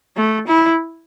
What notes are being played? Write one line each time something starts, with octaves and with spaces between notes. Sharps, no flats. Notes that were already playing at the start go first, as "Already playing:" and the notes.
A3
E4